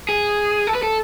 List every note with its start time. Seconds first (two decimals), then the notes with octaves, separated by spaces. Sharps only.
0.09 G#4
0.67 A4
0.75 B4
0.83 A4